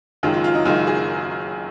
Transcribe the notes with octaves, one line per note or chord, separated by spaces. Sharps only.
F#1 F#2 D#3 G#3 F4
F4
F4
D#4
F#1 F#2 D#3 G#3 F4
G#4